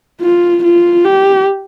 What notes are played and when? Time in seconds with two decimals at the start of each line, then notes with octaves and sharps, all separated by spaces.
0.21 F4
0.64 F4
1.05 G4